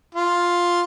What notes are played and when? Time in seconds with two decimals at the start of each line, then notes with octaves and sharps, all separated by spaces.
0.15 F4